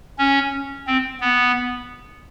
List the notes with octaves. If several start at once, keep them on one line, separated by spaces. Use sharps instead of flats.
C#4
C4
B3